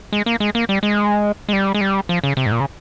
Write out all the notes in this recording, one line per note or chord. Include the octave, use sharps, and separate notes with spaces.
G#3
A#3
G#3
A#3
G3
G#3
G#3
G3
G#3
G3
F3
C#3
C3
G#2
A#2
C#3